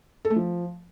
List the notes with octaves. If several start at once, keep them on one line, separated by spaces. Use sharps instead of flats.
A4
A3
F3